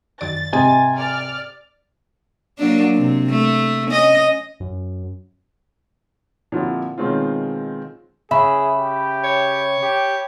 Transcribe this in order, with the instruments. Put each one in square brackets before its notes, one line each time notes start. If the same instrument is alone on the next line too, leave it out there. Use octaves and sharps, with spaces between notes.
[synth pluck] F#2 D#3 D5 [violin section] A6
[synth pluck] G#2 G4 D#5 [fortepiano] C3 [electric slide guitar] G#5
[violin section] D5 F6
[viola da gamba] F#3 A#3 D4
C3
A3
C#4 D#5
[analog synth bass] F#2
[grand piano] A#2 D3 F3 C4 E4 G4
B2 D#3 G#3 C4 C#4 F4
[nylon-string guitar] C#3 [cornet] G#4 [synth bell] E5 B5
[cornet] G4
[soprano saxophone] C#5
[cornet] G4